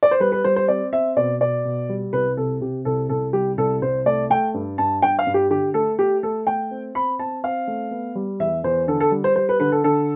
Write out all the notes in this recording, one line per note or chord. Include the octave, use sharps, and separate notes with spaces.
D5
C5
G3 B4
B4
G3 C5
C5
C4 D5
C4 E5
B2 D5
B2 D5
B2
G3
C2 B4
C3 A4
C3 G4
C2 A4
C2 A4
G3 G4
C2 A4
C2 C5
A3 D5
A3 G5
G2
G2 A5
G2 G5
F5
G2
G4
D3 G4
A3 A4
A3 G4
A3 A4
A3 G5
C4
C4 B5
C4 A5
C4 F5
A3
B3
G3
E2 E5
E2 C5
D3 A4
A4
G3
C5
G3 C5
B4
D3 B4
A4
D3 A4